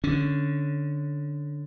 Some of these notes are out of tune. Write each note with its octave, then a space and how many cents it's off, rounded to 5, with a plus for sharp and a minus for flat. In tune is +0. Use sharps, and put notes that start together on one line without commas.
D3 +0 C#4 +0